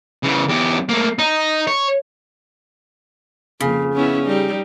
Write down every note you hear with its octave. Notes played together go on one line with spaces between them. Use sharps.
C#3 E3
E2 G4
A3 A#3
D#4
C#5
F2 C#3 A#3
B3 C#4 E4
G3 D#4